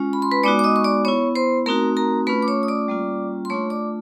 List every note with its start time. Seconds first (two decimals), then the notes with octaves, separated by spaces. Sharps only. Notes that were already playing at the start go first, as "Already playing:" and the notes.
Already playing: G#3 C#4 F4
0.13 B5
0.22 C6
0.31 B4 B5
0.43 G#3 B3 D#4 F#4 D5 D6
0.59 D6
0.64 D#5 D#6
0.76 C#6
0.84 D5 D6
1.05 B3 E4 C#5 C#6
1.35 C5 C6
1.66 A3 C4 D#4 F#4 A#4 A#5
1.97 A#4 A#5
2.27 A3 C#4 F4 B4 B5
2.42 D6
2.48 C#5 C#6
2.63 D#6
2.68 D5 D6
2.88 G3 A#3 C#4 F4
3.45 C6
3.50 A3 D4 F4 C#5 C#6
3.70 D5 D6